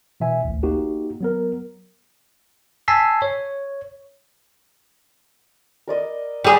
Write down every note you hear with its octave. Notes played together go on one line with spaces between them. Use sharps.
B2 E3 E5 G#5
A1 D2
A#3 D#4 F#4 G4
F#3 B3 A#4
G#5 A5 E6 B6 C7
C#5
A#4 D5 D#5
G3 G#4 B5 C#6 D6